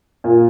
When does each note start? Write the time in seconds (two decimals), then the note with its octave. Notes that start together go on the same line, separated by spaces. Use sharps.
0.24 A#2